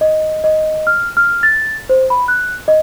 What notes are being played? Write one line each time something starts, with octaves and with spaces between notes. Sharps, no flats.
D#5
D#5
F6
F6
A6
C5
B5
F#6
D#5